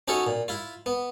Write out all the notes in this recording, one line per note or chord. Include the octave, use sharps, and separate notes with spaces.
C#4 D#4 F#4 A4 C#5
A#2
E4 F4
B3